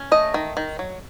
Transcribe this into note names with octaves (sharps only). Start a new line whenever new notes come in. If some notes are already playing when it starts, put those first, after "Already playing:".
Already playing: C#4
A3 D#5
D#3
D#3
F#3